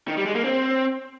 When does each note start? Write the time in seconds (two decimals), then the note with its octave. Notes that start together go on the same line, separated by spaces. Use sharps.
0.08 D#3
0.17 G3
0.26 G#3
0.35 A#3
0.44 C4